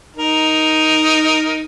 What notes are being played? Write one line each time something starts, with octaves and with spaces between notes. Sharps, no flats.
D#4 A#4